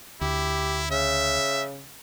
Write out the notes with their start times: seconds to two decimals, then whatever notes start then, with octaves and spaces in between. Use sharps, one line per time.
0.21 D2 E4 G4
0.91 C#3 E5